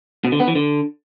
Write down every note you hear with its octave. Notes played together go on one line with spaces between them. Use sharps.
B2
D3
B3
E3
D3